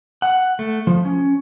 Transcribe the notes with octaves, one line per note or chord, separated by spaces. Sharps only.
F#5
A3
F3
C#4